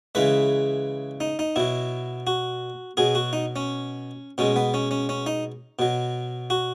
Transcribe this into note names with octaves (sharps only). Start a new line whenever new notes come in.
C#3 E3 G#3 B4
D#4
D#4
B2 F#3 E4
F#4
B2 F#3 G#4
F#4
D#4
C#4
B2 G#3 C#4
B3
C#4
C#4
C#4
D#4
B2 F#3
F#4